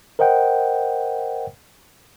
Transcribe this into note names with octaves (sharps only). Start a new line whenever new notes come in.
A#4 C5 D#5 F#5 G5